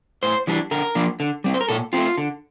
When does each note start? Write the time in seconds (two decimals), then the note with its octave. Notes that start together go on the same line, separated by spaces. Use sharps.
0.23 A2 C5
0.47 E3 G3 D4
0.71 D3 A#4
0.95 F3 A#3 D4
1.20 D3
1.44 G3 C4
1.54 C5
1.61 A#4
1.69 A#2 A4
1.93 A3 C4 F4
2.18 D3